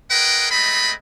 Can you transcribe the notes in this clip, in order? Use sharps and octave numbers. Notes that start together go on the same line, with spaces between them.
G#4 A#4 B4 D#5 F#5 G5
G#3 A3 C4 D#5 B5